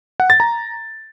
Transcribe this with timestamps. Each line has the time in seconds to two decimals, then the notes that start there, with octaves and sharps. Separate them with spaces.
0.20 F#5
0.30 A6
0.40 A#5